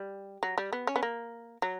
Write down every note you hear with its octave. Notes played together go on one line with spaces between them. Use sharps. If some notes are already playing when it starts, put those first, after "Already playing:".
Already playing: G3
F#3
G3
B3
C#4
B3
A#3
F#3